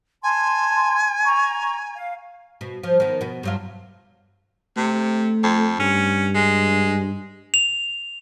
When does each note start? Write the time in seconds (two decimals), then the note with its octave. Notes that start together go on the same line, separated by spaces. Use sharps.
0.23 G#5 A5 C6
1.25 A#5 C#6
1.96 F5
2.61 B2
2.83 F3
3.00 D#3 B3
3.21 B2 B3
3.43 G2 F#3 F4
4.77 C3 A3
5.44 F2
5.80 G2 C#4
6.35 G#3
7.54 F7